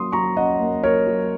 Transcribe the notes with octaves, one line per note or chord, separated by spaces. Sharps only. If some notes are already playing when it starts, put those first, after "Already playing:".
Already playing: F#3 A#3 C#4 C6 D#6
F#3 A#5 C#6
C#4 D#5 F#5
A#3
F#3 A#4 C#5
F#3